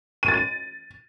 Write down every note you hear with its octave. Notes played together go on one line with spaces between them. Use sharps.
D#7
A6
D#7